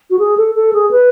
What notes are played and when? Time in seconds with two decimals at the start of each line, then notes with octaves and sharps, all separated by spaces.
0.10 F#4
0.19 G#4
0.37 A4
0.55 A4
0.73 G#4
0.91 B4